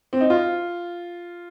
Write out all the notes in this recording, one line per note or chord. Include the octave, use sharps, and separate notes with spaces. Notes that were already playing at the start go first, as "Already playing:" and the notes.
C4
D#4
F4